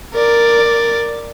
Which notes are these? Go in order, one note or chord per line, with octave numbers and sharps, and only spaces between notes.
A#4 D5